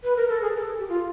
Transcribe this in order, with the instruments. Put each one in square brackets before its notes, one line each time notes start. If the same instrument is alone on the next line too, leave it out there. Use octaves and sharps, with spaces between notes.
[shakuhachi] B4
A#4
A4
G#4
A#4
A4
G4
F4